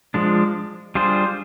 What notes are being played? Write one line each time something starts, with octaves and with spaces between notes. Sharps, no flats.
F3 G#3 D4
G3 D4 F4 G#4 C5